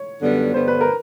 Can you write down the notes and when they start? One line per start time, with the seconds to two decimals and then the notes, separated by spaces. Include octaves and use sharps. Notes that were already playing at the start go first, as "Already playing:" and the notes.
Already playing: C#5
0.21 F#2 D3 G3 B3
0.54 G2 D3 G3 B3 C5
0.68 B4
0.81 A#4